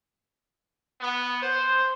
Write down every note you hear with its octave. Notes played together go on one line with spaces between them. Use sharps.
B3
C5